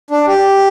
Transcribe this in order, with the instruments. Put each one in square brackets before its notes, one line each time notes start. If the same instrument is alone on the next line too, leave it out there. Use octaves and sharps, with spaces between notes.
[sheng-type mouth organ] D4
G4